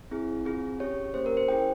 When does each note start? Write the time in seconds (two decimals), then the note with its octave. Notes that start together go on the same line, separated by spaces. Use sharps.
0.11 C4 E4 G#4
0.45 C4 F4 G#4
0.80 C#4 G4 C#5
1.14 A#3 C#4 G4 C5
1.26 A#4
1.37 C5
1.48 C#4 E4 G#4 G5